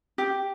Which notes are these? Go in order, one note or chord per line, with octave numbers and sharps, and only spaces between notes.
G4